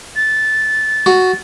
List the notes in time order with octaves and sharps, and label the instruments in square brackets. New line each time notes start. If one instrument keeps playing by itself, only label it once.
[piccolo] A6
[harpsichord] F#4